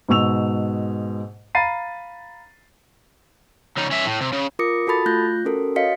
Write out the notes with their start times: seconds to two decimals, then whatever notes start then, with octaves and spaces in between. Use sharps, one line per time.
0.09 G#2 B2 C#6 E6 F7
1.55 F5 A#5 B5 A6 C7 D#7
3.77 C#3 D#4
3.91 C#4 E5
4.06 A2
4.21 C3
4.33 C#3
4.59 F4 A#4 D6 D#6 A#6 C#7
4.87 F4 F#4 A4 A5 B5 A6
5.06 A3 F4 F#6 G6 A#6
5.45 C#4 F#4 A4 A#4
5.76 F#4 C#5 D#5 F5 B6 C#7